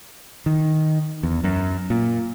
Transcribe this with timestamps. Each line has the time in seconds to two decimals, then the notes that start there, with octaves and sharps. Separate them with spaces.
0.46 D#3
1.23 E2
1.44 F#2
1.90 A#2